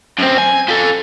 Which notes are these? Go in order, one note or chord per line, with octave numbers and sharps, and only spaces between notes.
F#2 C4
G#5
F3 A4